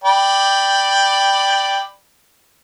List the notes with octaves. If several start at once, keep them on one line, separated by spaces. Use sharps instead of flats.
D5 G5 B5